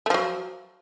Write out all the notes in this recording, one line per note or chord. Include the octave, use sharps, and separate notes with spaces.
F3 F#3 A3